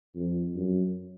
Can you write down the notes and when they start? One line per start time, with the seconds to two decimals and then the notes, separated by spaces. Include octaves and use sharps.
0.16 F2
0.55 F#2